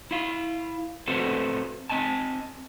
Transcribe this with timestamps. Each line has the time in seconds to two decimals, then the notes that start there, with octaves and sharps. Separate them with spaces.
0.11 E4 F5
1.07 A3 C4 F#4 A4 B4 C5
1.90 C4 D#5 G#5 A5